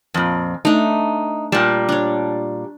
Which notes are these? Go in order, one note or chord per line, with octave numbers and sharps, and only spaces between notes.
F2 A#2
A3 D4 D#4
A#2 G3 A5
D4 C#5